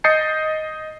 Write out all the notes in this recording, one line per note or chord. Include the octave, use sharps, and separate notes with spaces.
D#5 D#6 G6 A6 C7 C#7